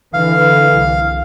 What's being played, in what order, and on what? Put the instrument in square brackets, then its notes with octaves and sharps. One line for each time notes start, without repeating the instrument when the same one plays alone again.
[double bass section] D3 E3 [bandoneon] F5
[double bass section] C2